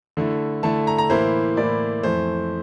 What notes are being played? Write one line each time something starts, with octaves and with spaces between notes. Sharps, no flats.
D3 A3 E4
D3 A3 E4 A5
A#5
A#5
A2 E3 A#3 E4 C5
A2 E3 A#3 E4 D5
F2 E3 A3 C5